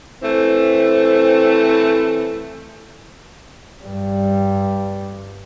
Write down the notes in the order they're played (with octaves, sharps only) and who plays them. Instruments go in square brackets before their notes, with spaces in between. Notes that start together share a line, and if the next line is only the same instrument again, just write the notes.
[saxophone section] E3 A3 C4
[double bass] G2 G3